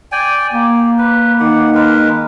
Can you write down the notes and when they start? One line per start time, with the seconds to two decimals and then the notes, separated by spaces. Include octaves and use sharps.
0.12 D5 G5 G#5
0.53 A#3 G4
0.98 B4
1.40 D#3 G4 F#5
1.74 G#3 A#4 B4